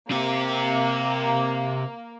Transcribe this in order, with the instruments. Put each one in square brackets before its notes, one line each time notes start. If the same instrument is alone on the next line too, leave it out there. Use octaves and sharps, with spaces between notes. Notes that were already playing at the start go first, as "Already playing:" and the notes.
[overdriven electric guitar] C3 G4 [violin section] A#3